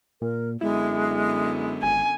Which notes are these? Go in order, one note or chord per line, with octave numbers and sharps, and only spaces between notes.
A#2 A#4
F#2 D3 G#3 B3 E4
G#1 G#5